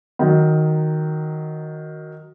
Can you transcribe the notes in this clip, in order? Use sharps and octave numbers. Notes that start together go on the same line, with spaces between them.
D#3 F#3